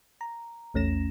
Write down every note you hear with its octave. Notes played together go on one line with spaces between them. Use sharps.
A#5
A#1 E2 A3 C#4 A#6 E7